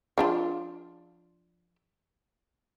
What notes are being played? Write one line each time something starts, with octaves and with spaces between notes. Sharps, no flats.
F3 D4 F4